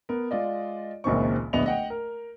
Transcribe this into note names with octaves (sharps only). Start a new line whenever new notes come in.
B3 A#4
G#3 F4 D5 D#5
F#1 C#2 A#2 D#3 C4 C#6
D1 A#1 B3 D#5 E5 F7
D#5 F#5 G5
A#4